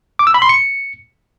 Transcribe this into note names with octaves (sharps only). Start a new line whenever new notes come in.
D6
E6
B5
C6
C#7